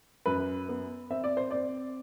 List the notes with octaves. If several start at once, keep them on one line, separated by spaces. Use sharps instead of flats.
F#2 B4
B3
C4 E5
D5
C5
C4 D5